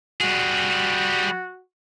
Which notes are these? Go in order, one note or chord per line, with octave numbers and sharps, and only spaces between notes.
G3 F#4 G#4